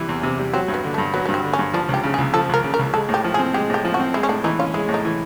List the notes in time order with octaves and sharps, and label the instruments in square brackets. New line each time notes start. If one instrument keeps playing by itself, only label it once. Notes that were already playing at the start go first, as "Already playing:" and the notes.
Already playing: [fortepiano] C3 E3 G3
E2
C3
G3
[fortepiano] F#3 [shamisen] C4
[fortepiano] G2
[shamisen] B3
[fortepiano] D3
[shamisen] A3
[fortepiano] G2
[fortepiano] F#3 [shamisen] B3
[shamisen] B3
[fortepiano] G2
[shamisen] C4
[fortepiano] D3
[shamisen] C#4
[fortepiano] G2
[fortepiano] F3 [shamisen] D4
[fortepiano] C#2
[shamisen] G4
[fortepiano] C#3
[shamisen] G#4
[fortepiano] C#2
[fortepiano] F3 [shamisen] A4
[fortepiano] C#2 [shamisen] A#4
[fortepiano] C#3
[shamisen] A#4
[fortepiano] C#2
[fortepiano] G#3 [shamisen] A4
[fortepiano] A2
[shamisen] G4
[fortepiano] F3
[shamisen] G#4
[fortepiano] C4
[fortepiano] G#3 [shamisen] G4
[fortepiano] A2 [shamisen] G4
[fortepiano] F3
[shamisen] F#4
[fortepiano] C4
[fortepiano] G#3 [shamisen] E4
[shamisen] C#4
[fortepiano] A2 [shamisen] D4
[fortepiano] E3 [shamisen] D#4
[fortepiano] C#4 [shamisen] F4
[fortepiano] G#3 [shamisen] E4
[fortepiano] A2
[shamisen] D#4
[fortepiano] E3